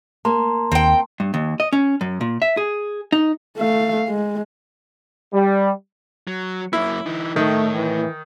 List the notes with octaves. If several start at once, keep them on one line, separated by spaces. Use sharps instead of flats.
A#3 A5 A#5 C6
D#2 C4 G5
G2
D#2
D#5
C#4
F#2
A#2
E5
G#4
D#4
A3 F5
G#3
G3
F#3
F#2 A#3 E4
E3 D#4
A2 D#3 A3
E3